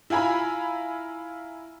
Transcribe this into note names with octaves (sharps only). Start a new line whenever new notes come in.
E4 F4 G#5 A#5 B5